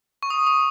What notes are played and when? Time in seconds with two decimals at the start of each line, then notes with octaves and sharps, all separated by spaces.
0.23 C#6
0.30 D#6
0.47 D#6